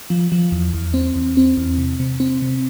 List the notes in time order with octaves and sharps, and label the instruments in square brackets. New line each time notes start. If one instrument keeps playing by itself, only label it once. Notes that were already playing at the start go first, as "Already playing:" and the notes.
[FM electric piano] F3
F3
E2
E2
C4
E2
C4
E2
C3
C3
C4
C3